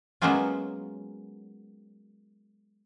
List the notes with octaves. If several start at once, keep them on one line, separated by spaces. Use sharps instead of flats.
F#3 G#3 A#3 B3 C#4 F4